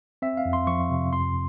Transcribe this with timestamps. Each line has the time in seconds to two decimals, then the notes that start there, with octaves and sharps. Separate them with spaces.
0.22 C4 E5
0.37 F5
0.45 F2
0.53 C6
0.67 F3 C#6
0.90 C3
1.13 F2 C6